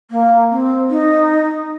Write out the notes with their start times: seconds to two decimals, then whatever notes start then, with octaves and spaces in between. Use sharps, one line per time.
0.11 A#3
0.51 C4
0.90 D#4